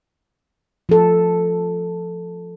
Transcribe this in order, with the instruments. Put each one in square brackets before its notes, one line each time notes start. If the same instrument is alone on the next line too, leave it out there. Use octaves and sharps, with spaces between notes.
[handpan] F3 A4